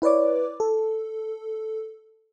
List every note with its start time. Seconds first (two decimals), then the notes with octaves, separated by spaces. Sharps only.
0.02 E4 B4 C#5 D5 D6
0.60 A4